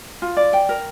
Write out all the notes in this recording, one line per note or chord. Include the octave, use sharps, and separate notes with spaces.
F4
D5
G5
A#4